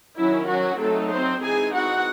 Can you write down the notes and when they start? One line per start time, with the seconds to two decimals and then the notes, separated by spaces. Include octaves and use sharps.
0.17 D#3 F#3 C#4 E4
0.48 F#3 F#4
0.79 F#3 A3 C4 D#4 A4
1.11 C4 C5
1.42 E3 G#3 C4 D#4 G#4 G#5
1.73 F#4 F#5